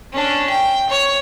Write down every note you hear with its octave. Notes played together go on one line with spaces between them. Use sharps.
C#4 D4
G5
C#5